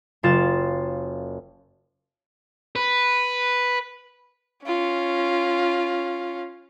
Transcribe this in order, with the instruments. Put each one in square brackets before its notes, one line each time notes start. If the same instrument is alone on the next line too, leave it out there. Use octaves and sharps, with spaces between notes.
[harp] F#1 F4 A6 E7
[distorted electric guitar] B4
[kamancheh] C#4 F4